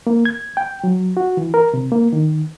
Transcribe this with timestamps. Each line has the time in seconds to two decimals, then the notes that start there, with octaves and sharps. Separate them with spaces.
0.07 A#3
0.25 G#6
0.57 G5
0.84 F#3
1.17 F#4
1.37 E3
1.54 A#4
1.74 C3
1.92 A#3
2.13 D#3